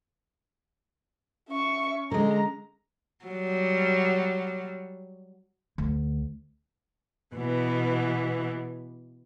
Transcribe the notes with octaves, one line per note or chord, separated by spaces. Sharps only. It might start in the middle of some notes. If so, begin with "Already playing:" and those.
C#4 E5 C#6
D3 G#3 A#5
F#3 G3
D2
B2 E3 B3